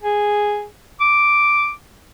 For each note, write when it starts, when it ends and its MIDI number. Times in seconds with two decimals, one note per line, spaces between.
0.03 0.64 68
1.00 1.72 86